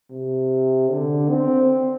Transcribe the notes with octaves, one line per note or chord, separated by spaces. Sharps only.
C3
D3
C4